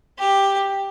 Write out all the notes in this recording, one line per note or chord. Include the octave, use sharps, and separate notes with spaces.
G4